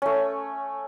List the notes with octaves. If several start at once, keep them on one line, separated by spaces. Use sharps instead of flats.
A3 C#4